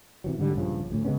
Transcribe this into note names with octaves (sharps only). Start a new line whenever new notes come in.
C3 E3 F#3
G#2 D3 G3
A#1 G2 C#3 F3
D2 A2
C#3 G#3 B3 C#4